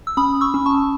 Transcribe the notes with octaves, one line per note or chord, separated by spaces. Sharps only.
E6
C#4 B5 D#6
C#6 E6
C#4
A5 C#6